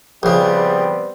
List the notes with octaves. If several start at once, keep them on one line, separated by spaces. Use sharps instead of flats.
A#1 C#3 G3 B3 C4